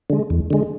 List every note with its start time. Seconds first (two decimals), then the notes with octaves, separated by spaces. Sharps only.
0.10 D3 G#3
0.30 E2
0.50 D3 G#3